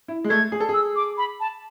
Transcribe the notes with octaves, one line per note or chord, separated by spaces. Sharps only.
E4
G#3
A3 G#6
G#4
A4
G#4 E6
D6
B5
A5